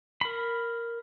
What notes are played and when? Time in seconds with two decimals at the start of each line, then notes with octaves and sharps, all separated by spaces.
0.21 A#4 B5